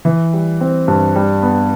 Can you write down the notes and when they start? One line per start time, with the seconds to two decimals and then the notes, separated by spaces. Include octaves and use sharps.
0.05 E3
0.33 G3
0.61 C4
0.88 G2
1.16 G3
1.42 B3